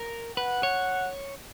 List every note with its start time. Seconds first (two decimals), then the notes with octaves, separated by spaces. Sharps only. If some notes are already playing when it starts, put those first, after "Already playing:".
Already playing: A#4
0.37 B4 F#5
0.63 C#5